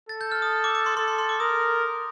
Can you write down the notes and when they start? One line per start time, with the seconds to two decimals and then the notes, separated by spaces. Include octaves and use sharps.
0.09 A4 A6
0.21 G6
0.32 F6
0.42 D#6
0.64 D6
0.75 D6
0.86 C6
0.97 A4 C6
1.08 C6
1.18 C6
1.29 D6
1.40 A#4 D#6